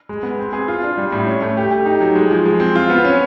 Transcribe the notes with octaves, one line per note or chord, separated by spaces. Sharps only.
G#3
B3
C4
G#4
F4
D4
G3
A2
C#4
A3
G4
G4
D#4
F#3
G#3
F3
G#3
C4
F4
B3
C#4